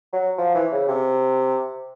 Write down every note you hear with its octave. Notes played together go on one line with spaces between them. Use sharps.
F#3
F3
E3
C#3
C3